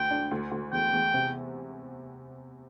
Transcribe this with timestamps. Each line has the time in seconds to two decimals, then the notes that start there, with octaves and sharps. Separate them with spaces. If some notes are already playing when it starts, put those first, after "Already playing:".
Already playing: D2 G5
0.11 D4
0.31 D2
0.51 D2
0.72 E2 G5
0.93 E2
1.14 C3